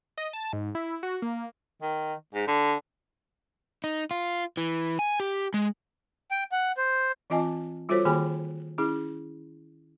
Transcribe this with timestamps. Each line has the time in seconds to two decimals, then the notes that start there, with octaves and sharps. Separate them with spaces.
0.18 D#5
0.33 A5
0.53 G#2
0.75 E4
1.03 F#4
1.22 A#3
1.82 D#3
2.34 G#2
2.47 D3
3.84 D#4
4.11 F4
4.57 E3
4.99 G#5
5.20 G4
5.54 G#3
6.31 G5
6.52 F#5
6.77 C5
7.30 E3 C4 F4 D#5 G#5 A5
7.89 G3 F4 F#4 A4 C5 C#5
8.05 D#3 A#3 F#4 G#4 G#5 B5
8.78 C#4 E4 G#4